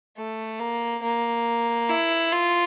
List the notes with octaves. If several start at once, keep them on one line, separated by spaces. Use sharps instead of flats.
A3
A#3
A#3
E4
F4